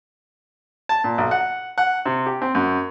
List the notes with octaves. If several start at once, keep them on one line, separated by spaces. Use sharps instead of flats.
A5
A#2
B1
F#5
F#5
C3
G4
C4
F#2